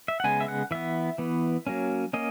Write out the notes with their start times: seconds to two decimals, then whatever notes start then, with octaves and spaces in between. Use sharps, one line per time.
0.08 E5
0.20 F#5
0.24 C#3 G#3 B3 G#5
0.40 E5
0.48 F#5
0.71 E3 B3 E5
1.18 E3 B3
1.67 F#3 A#3 C#4
2.13 A#3 C#4 D#5